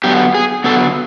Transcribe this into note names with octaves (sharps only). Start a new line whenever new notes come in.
D3 F#3 B3 G4
G#4
D3 F#3 B3 A4